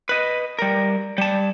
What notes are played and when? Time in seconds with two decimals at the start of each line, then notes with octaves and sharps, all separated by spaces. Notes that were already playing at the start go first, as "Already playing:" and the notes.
0.09 B4 D#5
0.59 G3 A#4
1.18 G3 A5